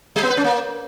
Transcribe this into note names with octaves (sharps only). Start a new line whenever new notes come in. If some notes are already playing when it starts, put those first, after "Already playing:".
G3
B3
B4
C#4
A#3